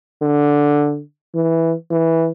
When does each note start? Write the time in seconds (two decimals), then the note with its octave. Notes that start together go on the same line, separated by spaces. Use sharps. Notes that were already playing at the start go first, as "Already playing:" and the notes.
0.22 D3
1.35 E3
1.91 E3